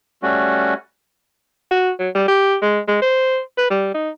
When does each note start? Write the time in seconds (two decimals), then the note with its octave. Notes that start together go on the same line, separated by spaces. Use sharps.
0.23 G3 A3 C#4 F#4
1.71 F#4
1.99 F#3
2.15 G3
2.28 G4
2.63 G#3
2.88 G#3
3.02 C5
3.58 B4
3.70 G3
3.94 D#4